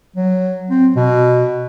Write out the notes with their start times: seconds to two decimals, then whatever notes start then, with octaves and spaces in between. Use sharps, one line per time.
0.16 F#3
0.70 C4
0.96 B2